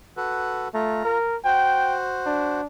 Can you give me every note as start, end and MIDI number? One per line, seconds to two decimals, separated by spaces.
0.17 0.68 66
0.17 0.68 69
0.17 0.68 71
0.74 1.03 57
0.74 1.18 65
0.74 1.18 82
1.05 1.37 70
1.45 2.61 66
1.45 2.61 72
1.45 1.98 79
2.26 2.67 62